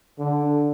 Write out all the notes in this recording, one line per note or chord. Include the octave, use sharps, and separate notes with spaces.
D3